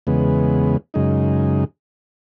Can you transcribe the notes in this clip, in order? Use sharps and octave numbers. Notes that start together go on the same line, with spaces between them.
E2 C#3 G#3 B3
F#2 C#3 G#3 D#4